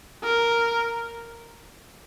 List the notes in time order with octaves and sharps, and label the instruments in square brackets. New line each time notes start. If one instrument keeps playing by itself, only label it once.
[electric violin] A#4